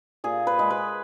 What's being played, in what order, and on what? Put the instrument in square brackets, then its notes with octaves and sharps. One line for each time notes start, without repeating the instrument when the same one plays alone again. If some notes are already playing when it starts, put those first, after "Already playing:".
[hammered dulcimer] A#2 G#4
B4
G#3
B4